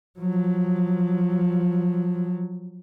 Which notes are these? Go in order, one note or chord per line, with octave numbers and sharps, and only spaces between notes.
F3 F#3